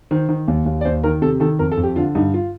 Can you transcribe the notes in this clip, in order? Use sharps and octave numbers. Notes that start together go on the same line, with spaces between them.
D#3 C5
D#3
D#2
D#2
D5
D#2 C5
D#3 A#4
C3 A4
D#3 A4
F2 A#4
A4
F2
G4
D3 F4
G2 D#4
F4